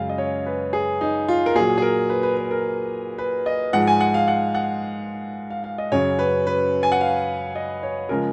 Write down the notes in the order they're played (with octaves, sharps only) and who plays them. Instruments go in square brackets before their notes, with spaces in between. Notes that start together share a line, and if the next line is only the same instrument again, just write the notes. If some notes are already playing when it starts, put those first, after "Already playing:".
Already playing: [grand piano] F#2 C#3 G#3 F5
D#5
C#5
B4
G#4
D#4
F4
A#4
A#2 F#3 G#4
G#4
A#4
B4
B4
B4
A#4
B4
D#5
G#2 F3 G#3 F#5
G#5
F#5
F5
F#5
F#5
F5
F5
D#5
F#2 C#3 F#3 C#5
B4
B4
G#5
F#5
F5
D#5
C#5
C#3 F3 G#3 A#4